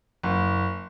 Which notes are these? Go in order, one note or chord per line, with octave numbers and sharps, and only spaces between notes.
F#1